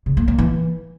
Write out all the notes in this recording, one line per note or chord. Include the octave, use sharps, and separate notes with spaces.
C#3
A#3
A#3
E3